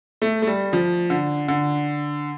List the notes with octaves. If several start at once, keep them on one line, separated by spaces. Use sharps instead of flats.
A3
A3
G3
F3
D3
D3